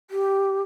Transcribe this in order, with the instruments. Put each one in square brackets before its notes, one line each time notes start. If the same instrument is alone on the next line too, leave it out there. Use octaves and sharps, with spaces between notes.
[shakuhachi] G4